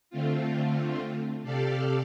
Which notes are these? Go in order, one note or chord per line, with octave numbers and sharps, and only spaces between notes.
D3 A3 C4 F4
C3 G4 A4 D5 F5